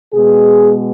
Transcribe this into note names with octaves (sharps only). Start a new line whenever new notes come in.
B2 G#3 B3 G#4